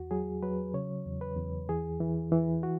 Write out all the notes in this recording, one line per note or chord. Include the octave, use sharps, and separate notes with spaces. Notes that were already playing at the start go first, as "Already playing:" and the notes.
Already playing: E2 F#4
F#3 G#4
F#3 B4
C#3 C#5
E2
B4
E2
E3 G#4
E3
E3
F#4